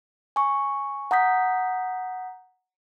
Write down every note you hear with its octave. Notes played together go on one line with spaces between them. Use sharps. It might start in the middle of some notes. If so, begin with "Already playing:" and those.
G#5 C#6
F#5 A#5 D#6 G6 B6